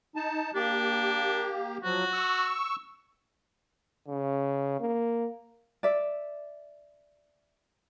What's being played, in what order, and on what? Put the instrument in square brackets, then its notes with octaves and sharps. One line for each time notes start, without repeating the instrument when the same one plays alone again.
[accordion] D#4 A5
[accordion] A#3 G4 [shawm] D4
[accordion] F3 F#3 [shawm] F#4
[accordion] C#6 E6
[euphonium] C#3
A#3
[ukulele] D5 E5